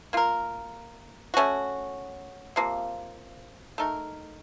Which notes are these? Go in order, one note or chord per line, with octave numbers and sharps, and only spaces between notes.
A#3 F4 A#4
A3 C#4 F#4
C3 F3 A#3
A3 D#4 A#4